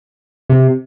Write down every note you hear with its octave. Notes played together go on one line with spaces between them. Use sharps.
C3